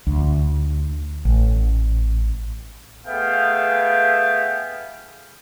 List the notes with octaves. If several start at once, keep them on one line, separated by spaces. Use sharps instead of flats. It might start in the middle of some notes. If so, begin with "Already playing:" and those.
D2
A1
A3 B3 G#4 E5 F5 G5